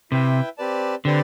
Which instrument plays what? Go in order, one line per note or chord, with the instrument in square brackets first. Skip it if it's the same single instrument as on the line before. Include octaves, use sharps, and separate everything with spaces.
[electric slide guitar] C3 [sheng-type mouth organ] E4 B4 E5 G5
[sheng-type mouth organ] C4 G4 B4 D5 A5
[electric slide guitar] D3 [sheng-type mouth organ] C4 G4 B4 D5